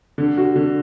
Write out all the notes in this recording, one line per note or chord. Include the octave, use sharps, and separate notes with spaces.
D3
F#4
D3